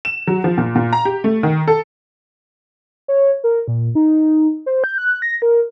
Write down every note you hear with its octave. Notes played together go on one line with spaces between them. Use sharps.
E7
F#3
F3
A#2
A#2
A#5
G4
A3
D#3
A4
C#5
A#4
A#2
D#4
C5
G6
F#6
A#6
A#4